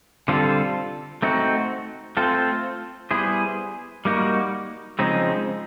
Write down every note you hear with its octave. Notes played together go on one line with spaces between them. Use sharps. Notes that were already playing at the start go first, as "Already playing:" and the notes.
D3 G3 C4 F4 A4
A3 C4 D#4 F#4
A3 C4 F4 A4 C5
G3 B3 E4 G#4 C5
G3 A#3 D#4 F#4
C#3 F3 G#3 C4 D#4